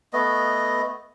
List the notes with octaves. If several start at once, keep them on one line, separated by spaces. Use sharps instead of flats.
A3 B3 D#5